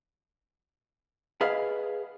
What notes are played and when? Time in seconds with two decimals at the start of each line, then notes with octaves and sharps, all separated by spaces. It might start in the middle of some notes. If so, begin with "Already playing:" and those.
1.41 G#4 B4 D#5 F5 F#5